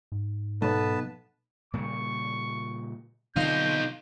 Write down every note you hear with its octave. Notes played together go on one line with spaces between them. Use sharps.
G#2
B1 B3 A4 B4 A5
A#2 C#3 G3 C#6
B2 D3 F#3 C4 D#4 F4 C6 G6